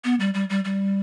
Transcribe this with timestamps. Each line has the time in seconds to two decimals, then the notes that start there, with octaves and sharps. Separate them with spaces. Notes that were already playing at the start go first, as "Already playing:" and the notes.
0.04 B3
0.20 G3
0.34 G3
0.50 G3
0.65 G3